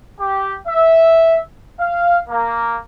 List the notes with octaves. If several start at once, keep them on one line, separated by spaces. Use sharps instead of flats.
G4
E5
F5
A#3